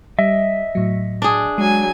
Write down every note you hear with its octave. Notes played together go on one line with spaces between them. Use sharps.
G3 D#5 E5
A2 F#3
D4 G#4
F#3 G#3 G#5